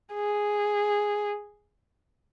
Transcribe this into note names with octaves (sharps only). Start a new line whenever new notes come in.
G#4